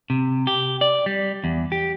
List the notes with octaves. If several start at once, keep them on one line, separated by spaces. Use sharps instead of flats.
C3
G4
D5
G3
E2
G4